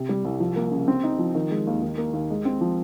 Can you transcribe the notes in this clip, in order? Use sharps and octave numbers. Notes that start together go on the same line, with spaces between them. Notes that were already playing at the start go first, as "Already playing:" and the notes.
Already playing: C3
G3
C2
F3
A#3
C#3
C4
D#4
F3
D#3
G#3
D#2
D#3
A#3
D#2
G#3
C4
F3